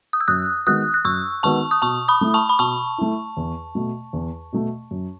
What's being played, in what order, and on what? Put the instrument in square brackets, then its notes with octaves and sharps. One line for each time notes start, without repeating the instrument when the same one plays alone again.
[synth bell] D#6
E6
[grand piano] F#2 [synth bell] D#6 F#6
[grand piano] D#3 G#3 B3 F#4 [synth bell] D#6 F#6
[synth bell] F#6
[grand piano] F#2 [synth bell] C#6 E6
[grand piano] D#3 G#3 B3 F#4 [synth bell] A5 C#6
[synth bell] D#6
[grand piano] B2 [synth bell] A5 C#6
[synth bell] B5 D#6
[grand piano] A3 E4
[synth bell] A5 C#6
B5
[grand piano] B2 [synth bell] A5 C#6
[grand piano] A3 E4
E2
B2 A3
E2
B2 A3
F#2